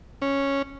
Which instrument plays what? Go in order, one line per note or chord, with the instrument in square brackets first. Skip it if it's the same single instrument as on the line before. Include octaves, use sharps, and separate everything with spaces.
[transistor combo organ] C#4